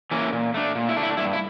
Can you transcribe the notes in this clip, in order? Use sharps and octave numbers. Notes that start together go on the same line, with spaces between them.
E3 A#3 C#4
A#2
A3 D4
A#2
E4
A3 D4
E4
G2 E4
E4